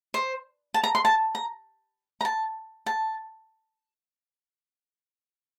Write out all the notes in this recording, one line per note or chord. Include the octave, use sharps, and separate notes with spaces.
C5
A5
A#5
C6
A5
A#5
A#5
A5
A5